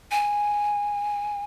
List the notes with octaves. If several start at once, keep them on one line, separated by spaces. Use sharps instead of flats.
G#5